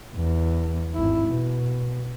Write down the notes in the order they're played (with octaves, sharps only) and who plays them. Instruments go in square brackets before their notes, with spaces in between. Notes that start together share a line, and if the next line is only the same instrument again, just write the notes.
[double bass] E2
G#1 E4
B2